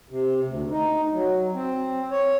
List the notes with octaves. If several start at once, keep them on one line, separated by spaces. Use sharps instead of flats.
C3
D2
D#4
F#3
C4
C#5